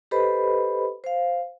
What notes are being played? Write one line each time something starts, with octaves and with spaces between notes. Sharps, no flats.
G4 A4 B4 C5 D#5 B5
C5 F5